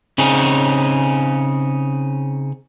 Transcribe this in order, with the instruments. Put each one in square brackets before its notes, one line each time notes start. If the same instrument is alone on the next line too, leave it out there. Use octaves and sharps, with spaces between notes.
[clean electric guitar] C#3 C4 C#4 D#4 G#4